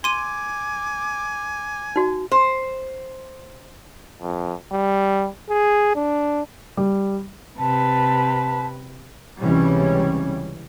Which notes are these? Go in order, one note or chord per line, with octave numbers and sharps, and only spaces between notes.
G#5 C6 D6 D#7
D#4 F#4
C5
F2
G3
G#4
D4
G3
C3 B4 A5
C#2 C3 E3 G3 C#4